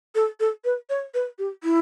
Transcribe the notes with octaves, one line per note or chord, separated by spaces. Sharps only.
A4
A4
B4
C#5
B4
G4
E4